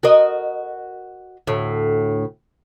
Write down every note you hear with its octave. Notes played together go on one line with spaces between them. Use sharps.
F#4 A#4 D#5
D2 A2